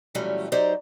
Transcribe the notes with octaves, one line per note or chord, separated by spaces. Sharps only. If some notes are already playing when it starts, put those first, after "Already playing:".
A#2 E3 F#3 G3 A3 C#4
F#3 D#4 G4 C5 D5 A#5